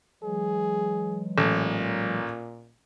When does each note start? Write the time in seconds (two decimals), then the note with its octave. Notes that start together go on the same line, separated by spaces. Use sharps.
0.23 E3 F#3 G#3 G#4
1.38 A1 A#2